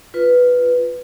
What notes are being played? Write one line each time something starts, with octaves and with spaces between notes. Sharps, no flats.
F4 B4